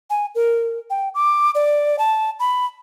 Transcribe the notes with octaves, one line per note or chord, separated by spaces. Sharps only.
G#5
A#4
G5
D6
D5
A5
B5